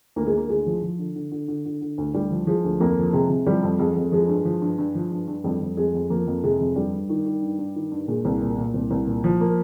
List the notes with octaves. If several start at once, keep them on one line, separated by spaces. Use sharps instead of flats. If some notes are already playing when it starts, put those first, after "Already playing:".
D2 A#3
G#3
D3 A#3
D2 G#3
F3
F3
D3
D3
D3
D3
D3
D3
D2
D2 G3
F3
F3 G#3
D2
F2 A#3
F3
C3 G#3
C3
F3 G3
F2
F2 G#3
F2
F3 G#3
G2
F3
G2
G2
F3
G2
G2
F2 G3
F2
F2 G#3
F2
F3 A#3
F2
C3 G#3
F2
G2 G3
G2
D#3
D#3
G2
G2
D#3
G2
A#2 G#3
C2
A#2
A#2
C2
C2
A#2
F3
A#3